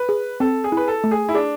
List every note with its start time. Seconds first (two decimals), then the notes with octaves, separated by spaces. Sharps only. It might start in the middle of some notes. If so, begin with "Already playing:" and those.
Already playing: B4
0.09 G#4
0.40 C4 A4
0.64 G#4
0.72 E4 B4
0.88 A4
1.04 A3
1.11 G#4
1.28 E4
1.34 D4 G#4